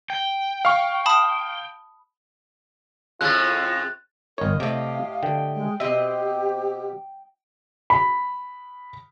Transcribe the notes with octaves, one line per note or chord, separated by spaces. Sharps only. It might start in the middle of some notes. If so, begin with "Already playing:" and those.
G5
F5 C#6
A5 B5 D#6
F2 A2 G#3 F4 F#6 A6
G1 A#4 C#5 D#5
A2 C3 A3 G4 F5
D3 G5
G#3
B2 C4 G4 D#5 E5
B5